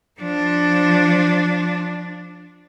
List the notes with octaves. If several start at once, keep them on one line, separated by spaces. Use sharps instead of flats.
F3 D4